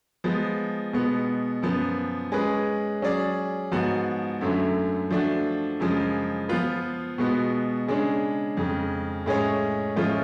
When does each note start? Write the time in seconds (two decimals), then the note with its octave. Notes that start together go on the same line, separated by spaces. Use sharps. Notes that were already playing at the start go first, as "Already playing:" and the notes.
0.24 F3 G#3 B3
0.93 B2 G#3 B3
1.62 F#2 F3 B3
2.32 G#3 C#4 G#4 B4
3.02 F#3 C#4 G#4 D5
3.72 G#2 F3 B3 F#4
4.41 F#2 D3 F#3 A3
5.10 F3 A3 D4 F#4
5.80 F#2 C#3 F3 G#3
6.49 F3 B3 F4 B4
7.18 B2 G#3 B3 F#4
7.88 C#3 G#3 D4 G#4 C#5
8.57 F2 C#3 G#3
9.26 A2 G#3 C#4 G#4 C#5
9.96 A2 F3 G#3 C#4 F4